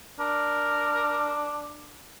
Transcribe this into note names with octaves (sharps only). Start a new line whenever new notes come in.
D4 A#4